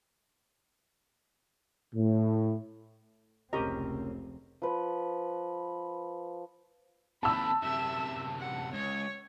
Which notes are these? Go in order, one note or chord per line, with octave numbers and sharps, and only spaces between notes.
A2
F1 C#2 C4 C#4 G4 A#4 D#5
F3 B4
D#2 C3 A5 B5 E6
F#2 C3 E5
F#5
C#2 C#5